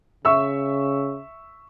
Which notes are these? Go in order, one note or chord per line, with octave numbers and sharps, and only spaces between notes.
C#3 E5 C#6 E6